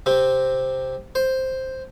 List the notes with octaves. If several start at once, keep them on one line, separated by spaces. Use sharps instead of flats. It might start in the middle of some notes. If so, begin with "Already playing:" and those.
C3 C4
C5